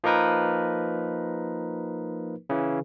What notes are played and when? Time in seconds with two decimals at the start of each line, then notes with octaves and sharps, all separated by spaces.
0.04 F3 A#3 D#4 A#4 B4
2.49 C#3 E3